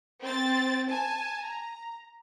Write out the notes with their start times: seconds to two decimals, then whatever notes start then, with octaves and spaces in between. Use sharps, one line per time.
0.22 C4 A6
0.89 G#5 A5
1.43 A#5